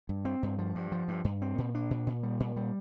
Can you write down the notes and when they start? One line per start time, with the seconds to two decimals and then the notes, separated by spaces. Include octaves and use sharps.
0.09 G2
0.25 C4
0.43 G2
0.58 F3
0.75 G2
0.92 F3
1.08 G2
1.24 G2
1.42 C4
1.58 A#2
1.75 D4
1.91 A#2
2.07 A#2
2.23 G3
2.40 A#2
2.56 G3